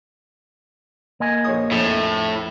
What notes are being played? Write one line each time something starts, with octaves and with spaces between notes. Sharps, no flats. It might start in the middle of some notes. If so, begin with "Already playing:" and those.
A#3 D#5 G#5
A#1 C#5 D#6
A#1 F2 A2 A4